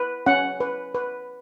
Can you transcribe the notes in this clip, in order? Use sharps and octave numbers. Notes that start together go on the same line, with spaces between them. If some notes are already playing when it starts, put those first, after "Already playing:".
Already playing: B4
C#4 F#5
B4
B4